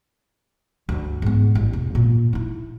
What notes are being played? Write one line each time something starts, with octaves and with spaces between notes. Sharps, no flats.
D2 G2
G#2 B3
A1
E1
A#2
D#4 E4